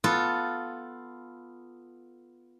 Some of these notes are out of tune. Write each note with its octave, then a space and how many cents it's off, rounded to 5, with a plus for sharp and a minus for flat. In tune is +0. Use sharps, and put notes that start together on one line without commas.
B3 +0 F4 +0 A4 +0